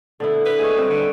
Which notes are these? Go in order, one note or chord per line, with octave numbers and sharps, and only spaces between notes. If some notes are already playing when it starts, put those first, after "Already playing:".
D3 B3 E4 A4
B4
G#4 C#5 D#5 E5
G3 C4 B4
D3 C#5